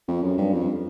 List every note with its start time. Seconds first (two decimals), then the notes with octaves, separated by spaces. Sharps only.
0.08 F2
0.23 F#2
0.38 G2
0.53 F2